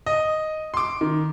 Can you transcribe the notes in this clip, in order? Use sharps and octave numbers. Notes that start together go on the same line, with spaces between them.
D#5
C6 D6
D#3